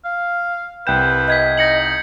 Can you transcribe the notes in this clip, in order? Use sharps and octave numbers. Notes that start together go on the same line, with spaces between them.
F5
C2 B4 G5 G6 E7
D#5 G6 G#6 B6
D#4 A#6 C#7 F#7